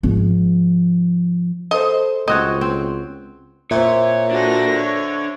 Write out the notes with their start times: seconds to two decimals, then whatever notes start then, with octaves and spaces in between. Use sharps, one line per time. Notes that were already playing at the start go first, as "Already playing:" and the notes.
0.03 G#2 F3
1.71 A4 C5 D#5
2.28 C#2 C4 F#4 C#5 D#5
2.61 C4
3.71 A#2 C5 C#5 E5
4.31 D4 F#4 A4 A#6
4.78 C#5